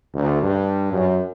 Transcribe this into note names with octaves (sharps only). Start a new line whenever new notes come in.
D2
G2
F#2